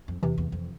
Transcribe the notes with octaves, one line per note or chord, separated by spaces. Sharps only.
F2
E2 C3 E3
E2
F2